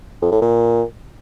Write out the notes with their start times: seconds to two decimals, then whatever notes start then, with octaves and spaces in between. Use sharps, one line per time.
0.22 F2
0.32 A2
0.42 A#2